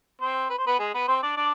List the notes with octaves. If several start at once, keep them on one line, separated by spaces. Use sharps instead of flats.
C4 C5
B4
C5
B3 B4
G#3 G#4
B3 B4
C4 C5
D4 D5
D4 D5